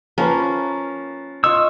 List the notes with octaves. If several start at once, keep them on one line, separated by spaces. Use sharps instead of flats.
F3 A#3 C#4 B4
F4 C#5 D#5 E6